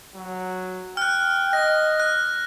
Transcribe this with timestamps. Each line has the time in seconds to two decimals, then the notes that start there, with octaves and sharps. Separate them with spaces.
0.15 F#3
0.97 G5 F6 F#6
1.53 D#5 A#6
2.00 F#6